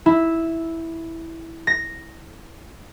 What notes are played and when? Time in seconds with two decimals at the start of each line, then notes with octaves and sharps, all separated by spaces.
0.06 E4
1.67 A#6